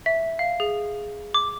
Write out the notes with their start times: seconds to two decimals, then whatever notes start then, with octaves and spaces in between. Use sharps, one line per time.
0.06 E5
0.39 F5
0.60 G#4
1.34 D6